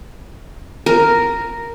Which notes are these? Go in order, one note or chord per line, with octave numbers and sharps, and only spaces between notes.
A#4